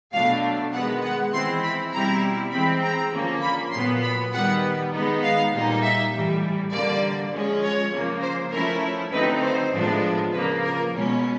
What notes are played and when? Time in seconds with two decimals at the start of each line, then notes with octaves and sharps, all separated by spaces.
0.12 B2 F#3 A3 D4 F5
0.72 D#3 G#3 B3 F#5
1.02 F#5
1.32 E3 G#3 C4 E4 C6
1.63 B5
1.93 B2 G3 C4 E4 A#5
2.52 E3 G#3 C4 B5
2.82 A#5
3.12 D3 F3 A#3 C#4
3.42 B5
3.72 A#2 F#3 B3 C6
4.02 B5
4.32 D#3 G3 B3 F#5
4.92 D#3 G#3 B3 D#4
5.22 F5
5.51 A#2 G3 A#3 D#4
5.82 E5
6.12 A2 E3 G3
6.72 D3 G3 A#3 D5
7.32 F3 G#3 C#4
7.62 C#5
7.92 C#3 F3 A#3
8.22 C5
8.52 F3 A3 C#4 E4 A#4
9.12 D3 F#3 A3 C4 D#4 B4
9.41 C5
9.71 A2 F3 G#3 B3 D4
10.32 C#3 F3 A#3 B4
10.62 A#4
10.92 B2 G#3 C#4